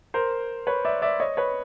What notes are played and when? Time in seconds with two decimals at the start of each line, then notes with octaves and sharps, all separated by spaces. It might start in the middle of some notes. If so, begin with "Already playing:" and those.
0.14 A#4 C5
0.67 B4 C#5
0.85 D5 E5
1.02 D5 E5
1.20 C#5 D#5
1.37 B4 C#5